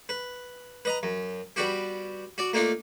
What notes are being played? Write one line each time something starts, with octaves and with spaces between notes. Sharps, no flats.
B4
B4 D#5 A#5
F#2
G3 B3 F#4 G4
F#4 D5
A3 A#3 D4 D#4 F4